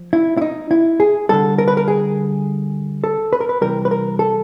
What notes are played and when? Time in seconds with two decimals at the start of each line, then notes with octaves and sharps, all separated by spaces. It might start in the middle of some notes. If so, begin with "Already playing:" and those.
Already playing: F3
0.13 E4
0.37 E4
0.42 D#4
0.71 E4
1.00 G#4
1.29 D3 G3 A4
1.58 A#4
1.68 B4
1.77 A#4
1.88 G#4
3.04 A4
3.33 B4
3.41 A#4
3.49 B4
3.61 C3 E3 G3 A#4
3.85 B4
3.91 A#4
4.19 A4